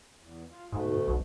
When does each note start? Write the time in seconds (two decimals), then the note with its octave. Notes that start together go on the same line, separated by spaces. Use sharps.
0.19 E2
0.50 F4
0.72 D2 G#2 B2 A3
1.08 B1